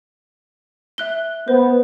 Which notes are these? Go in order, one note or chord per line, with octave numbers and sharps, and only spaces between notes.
E5 F#6 G7
B3 C5